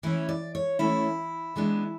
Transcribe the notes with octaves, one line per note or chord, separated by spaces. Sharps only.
E3 A3 C#4 E4
D5
C#5
E3 A3 C#4 E4
E3 G#3 B3 D4